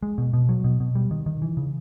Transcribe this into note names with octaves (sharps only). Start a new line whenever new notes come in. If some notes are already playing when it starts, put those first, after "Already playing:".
G#3
B2
B2
F#3
B2
B2
G3
D#3
D#3
E3
C#3